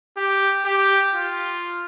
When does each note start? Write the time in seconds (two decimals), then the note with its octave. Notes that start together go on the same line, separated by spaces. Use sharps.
0.17 G4
0.65 G4
1.15 F4